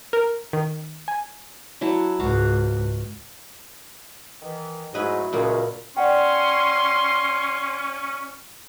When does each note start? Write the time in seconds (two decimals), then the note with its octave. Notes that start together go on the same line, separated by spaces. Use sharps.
0.13 A#4
0.53 D#3
1.08 G#5
1.81 F#3 E4 A5
2.19 C#2 G#2 F#4 F5
4.42 D#3 E3
4.94 G#2 F#3 A3 E4 B4 D#5
5.33 C#2 A#2 A#3 B3
5.97 C#4 D5 F#5 G5 C6